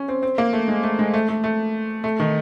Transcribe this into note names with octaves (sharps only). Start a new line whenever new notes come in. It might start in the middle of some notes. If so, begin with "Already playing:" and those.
Already playing: C#4
C4
C4
A#3
A3
G#3
A3
G#3
A3
A3
A3
A3
D#3